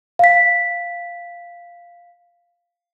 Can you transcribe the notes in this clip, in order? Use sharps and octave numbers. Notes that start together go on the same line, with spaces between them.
F5 B6